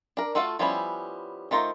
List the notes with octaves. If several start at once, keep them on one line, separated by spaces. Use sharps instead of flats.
D4 A#4
A3 F4 F#4 A4 F5
F3 G3 B3 C#4 E4
D#3 A3 F4 C5 A#5